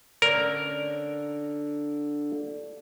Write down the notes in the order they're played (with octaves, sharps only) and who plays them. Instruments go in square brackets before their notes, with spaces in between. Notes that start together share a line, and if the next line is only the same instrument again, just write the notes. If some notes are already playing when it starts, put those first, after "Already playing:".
[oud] D3 C#4 [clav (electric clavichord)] A#4